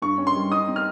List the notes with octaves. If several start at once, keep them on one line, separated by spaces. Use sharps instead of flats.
G2 C#6
C#4
C6
G3
D#4 D#6
C4
F6